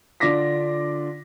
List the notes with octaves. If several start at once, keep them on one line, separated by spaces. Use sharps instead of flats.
D3 D4 F4 D6 A#6 B6